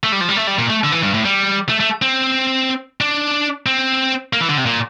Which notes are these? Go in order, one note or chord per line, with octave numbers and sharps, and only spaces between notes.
A3
G3
F3
G3
A3
G3
A#2
A3
D3
E3
G2
A2
G3
A3
A3
C4
D4
C4
A#3
E3
D3
C3
A#2